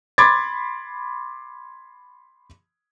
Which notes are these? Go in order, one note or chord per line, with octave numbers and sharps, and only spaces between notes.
B5 C6 D6 G#6 A6